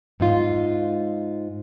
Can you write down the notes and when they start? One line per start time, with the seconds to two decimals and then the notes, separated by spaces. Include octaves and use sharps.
0.20 G#2 D#4 F4